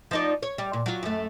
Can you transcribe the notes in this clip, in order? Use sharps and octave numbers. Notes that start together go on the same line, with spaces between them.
F3 D#4 D5
C#5
G3
A#2
F#3 F4
F#2 A3